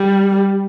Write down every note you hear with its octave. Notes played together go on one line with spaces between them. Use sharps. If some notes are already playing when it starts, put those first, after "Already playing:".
Already playing: G3